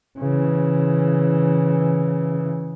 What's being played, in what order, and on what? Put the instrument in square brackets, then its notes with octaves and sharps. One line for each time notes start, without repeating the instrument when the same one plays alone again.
[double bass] C#3 E3